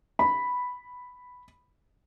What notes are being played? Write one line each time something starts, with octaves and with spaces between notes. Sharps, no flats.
B5